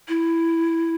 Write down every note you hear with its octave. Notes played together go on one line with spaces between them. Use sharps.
E4